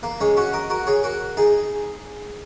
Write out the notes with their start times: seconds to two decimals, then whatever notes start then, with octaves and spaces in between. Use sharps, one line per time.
0.03 A#3
0.20 G#3 C#4
0.37 C#4 F#4
0.53 A#4 D#5
0.70 F#4 A#4
0.87 G#4 C#5
1.03 F#4 A#4
1.37 D#4 G#4